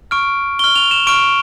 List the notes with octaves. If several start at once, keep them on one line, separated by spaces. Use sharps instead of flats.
C#6 F6 D7
C#6 F6 G7
F7
E7
C#6 F6 D7